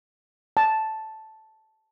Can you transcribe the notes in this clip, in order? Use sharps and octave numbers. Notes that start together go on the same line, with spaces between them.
A5